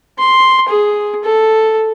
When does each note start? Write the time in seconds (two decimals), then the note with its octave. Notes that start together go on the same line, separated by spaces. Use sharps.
0.19 C6
0.69 G#4
1.24 A4